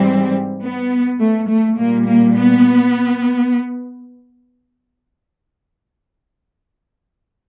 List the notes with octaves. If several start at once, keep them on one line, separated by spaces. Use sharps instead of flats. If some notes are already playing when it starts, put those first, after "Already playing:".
Already playing: G#2 E3 G3 C4
B3
A3
A3
A#2 G3 A#3
A#3
B3